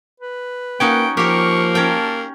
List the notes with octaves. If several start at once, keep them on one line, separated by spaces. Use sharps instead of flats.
B4
A#3 C#4 D#4 F#4 G5
F3 A#3 G4 A#4 C#6
C#4 A#4 G5 A5